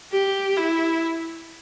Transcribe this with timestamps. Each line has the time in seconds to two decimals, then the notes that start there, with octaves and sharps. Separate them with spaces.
0.11 G4
0.56 E4